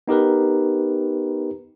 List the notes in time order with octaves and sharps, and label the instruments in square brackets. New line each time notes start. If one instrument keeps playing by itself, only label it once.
[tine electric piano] B3 D#4 G4 A#4 B4